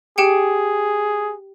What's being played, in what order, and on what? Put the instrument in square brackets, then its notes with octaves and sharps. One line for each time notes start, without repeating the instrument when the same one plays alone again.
[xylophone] G4 G5 C#7 [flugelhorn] G#4